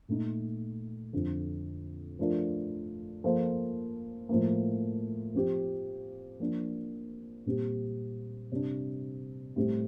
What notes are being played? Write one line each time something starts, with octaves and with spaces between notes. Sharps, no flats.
A#2 A3 D#4
F2 D3 F3
F3 A3 D4 F4 A#4
F3 A#3 F4 A4 C5
A2 F3 A#3
F3 C4 G4
F3 A#3 D4
A#2 G3 C4 G4
C3 G3 D4
A2 G3 C4 G4